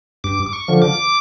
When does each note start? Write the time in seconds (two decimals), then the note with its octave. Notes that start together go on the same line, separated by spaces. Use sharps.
0.24 G2 D6
0.46 D6
0.53 C#6
0.68 D3 F3
0.82 D6